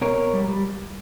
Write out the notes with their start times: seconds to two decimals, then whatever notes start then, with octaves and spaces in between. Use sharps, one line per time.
0.01 B2 A#4 C#5
0.17 B2
0.33 G3
0.48 G3